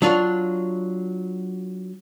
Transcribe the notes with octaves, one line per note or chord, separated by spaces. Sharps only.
F#3 D4 F4